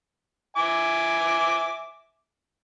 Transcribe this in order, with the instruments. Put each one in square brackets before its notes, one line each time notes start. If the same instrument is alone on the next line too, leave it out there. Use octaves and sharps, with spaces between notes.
[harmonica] E5 G#5 D6